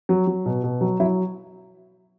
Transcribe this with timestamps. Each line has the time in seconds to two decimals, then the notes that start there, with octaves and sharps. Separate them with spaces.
0.09 F#3
0.27 F#3
0.46 B2
0.63 B2
0.81 F#3
1.00 F#3 E4